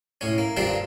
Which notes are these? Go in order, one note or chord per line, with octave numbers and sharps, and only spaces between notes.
A2 C#4
A#3
G2 D3 A#3 C4 D4 F4